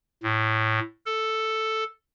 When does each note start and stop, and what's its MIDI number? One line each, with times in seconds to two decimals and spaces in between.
0.23 0.79 45
1.06 1.84 69